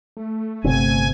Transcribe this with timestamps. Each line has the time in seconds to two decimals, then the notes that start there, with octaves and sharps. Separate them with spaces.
0.17 A3
0.64 G1 C3 B3 C4 G#5